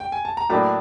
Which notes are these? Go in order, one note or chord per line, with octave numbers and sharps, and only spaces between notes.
G5
G#5
A5
A#5
A2 F#3 A#3 D4 A5 B5